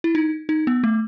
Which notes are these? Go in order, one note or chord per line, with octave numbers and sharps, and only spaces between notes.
E4
D#4
D#4
B3
A3